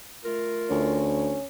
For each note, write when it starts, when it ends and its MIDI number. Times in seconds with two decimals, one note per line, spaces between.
0.24 1.05 57
0.24 1.05 65
0.24 1.05 70
0.70 1.37 38
0.70 1.46 61